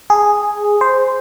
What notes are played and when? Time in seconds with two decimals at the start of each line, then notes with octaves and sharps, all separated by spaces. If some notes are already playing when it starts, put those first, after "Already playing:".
0.10 G#4
0.81 C5